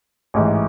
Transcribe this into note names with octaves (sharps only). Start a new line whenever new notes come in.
A1 G#2 E3